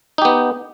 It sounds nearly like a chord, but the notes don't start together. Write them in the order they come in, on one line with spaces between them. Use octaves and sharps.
D#4 G4 B3